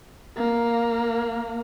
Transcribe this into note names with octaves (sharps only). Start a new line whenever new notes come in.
A#3